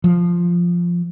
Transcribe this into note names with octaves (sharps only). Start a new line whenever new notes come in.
F3